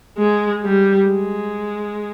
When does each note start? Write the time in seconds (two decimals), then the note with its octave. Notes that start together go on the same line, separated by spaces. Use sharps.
0.18 G#3
0.63 G3
1.08 G#3